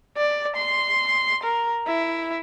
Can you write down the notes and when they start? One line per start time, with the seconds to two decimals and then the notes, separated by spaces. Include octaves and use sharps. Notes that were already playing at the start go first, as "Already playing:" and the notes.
0.17 D5
0.56 C6
1.43 A#4
1.87 E4